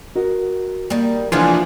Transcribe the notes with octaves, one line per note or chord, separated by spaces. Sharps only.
F#4 A#4 D#5
D#3 G3 A#3
C#3 E3 F3 G#3 B3 D4 F4